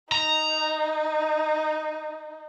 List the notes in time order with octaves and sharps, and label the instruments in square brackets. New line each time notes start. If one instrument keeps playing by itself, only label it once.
[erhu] D#4 [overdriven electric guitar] A#5